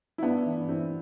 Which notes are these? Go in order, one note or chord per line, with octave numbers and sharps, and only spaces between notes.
E4
G2 B3 D4
E3
G2 C4 E4